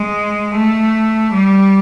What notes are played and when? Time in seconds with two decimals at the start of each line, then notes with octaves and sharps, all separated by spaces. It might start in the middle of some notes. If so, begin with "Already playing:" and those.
Already playing: G#3
0.55 A3
1.33 G3